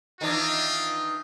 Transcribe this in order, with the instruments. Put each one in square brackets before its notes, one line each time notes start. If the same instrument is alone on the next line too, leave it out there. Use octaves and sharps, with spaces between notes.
[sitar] D#3 E3 D4 [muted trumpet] F4